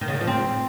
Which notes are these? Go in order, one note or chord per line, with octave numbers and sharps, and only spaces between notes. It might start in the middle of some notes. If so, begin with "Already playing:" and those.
D#3
C#3
D#3
F3
C4